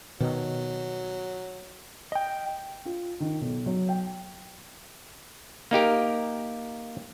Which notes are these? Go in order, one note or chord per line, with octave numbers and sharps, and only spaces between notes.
B2 D#3 F#3
D#5 G5
F4
D#3
B1
F#3
G5
A#3 D#4 G4 A#4